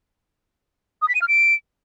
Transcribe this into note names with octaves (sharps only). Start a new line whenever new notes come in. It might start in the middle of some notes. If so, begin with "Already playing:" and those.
D#6
B6
D#7
F6
D7